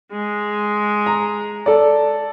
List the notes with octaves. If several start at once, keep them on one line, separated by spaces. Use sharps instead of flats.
G#3
A#5
A4 D5